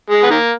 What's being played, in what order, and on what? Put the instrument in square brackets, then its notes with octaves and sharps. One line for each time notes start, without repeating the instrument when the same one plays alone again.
[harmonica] G#3
B3
D#3 A#3